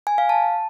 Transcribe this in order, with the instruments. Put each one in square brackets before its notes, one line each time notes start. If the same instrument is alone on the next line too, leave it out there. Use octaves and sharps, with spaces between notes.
[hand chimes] G#5
F5
A5